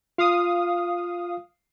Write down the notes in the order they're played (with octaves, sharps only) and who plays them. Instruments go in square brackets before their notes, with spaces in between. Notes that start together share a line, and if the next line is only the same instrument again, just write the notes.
[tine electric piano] F4 [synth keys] F5 D#6